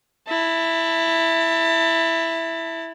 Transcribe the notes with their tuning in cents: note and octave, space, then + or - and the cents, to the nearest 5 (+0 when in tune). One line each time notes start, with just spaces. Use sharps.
E4 +0 A5 +30